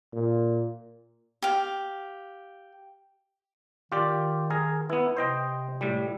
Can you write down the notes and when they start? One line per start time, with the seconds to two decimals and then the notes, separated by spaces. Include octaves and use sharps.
0.13 A#2
1.42 G4 F5
3.92 D#3 F4 G4 D5
4.50 G#4 A#4
4.90 B3 E4 B4
5.17 C3 C5 D#5 G5
5.81 A2 G3